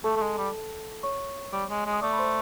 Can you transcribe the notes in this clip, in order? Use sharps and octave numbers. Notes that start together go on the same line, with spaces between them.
A3 A4 A5
A3
G#3
G3
C#5 C#6
G3
G#3
G#3
D#6
A3 D5 D6
B5
C5 C6